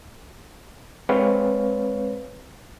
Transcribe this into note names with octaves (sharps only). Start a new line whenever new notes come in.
G#3 C4 B4 C#5 F5